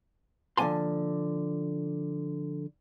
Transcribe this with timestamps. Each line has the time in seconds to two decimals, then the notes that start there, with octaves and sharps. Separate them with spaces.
0.57 D3 F3 A#3 G#5 A5 C6